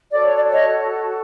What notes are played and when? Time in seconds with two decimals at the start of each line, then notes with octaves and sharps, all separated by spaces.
0.09 F#4 A4 C#5 D5
0.22 C#5
0.34 D5
0.52 C#5 D#5